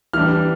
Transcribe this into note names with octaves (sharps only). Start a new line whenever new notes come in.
E3 G3 D4 F6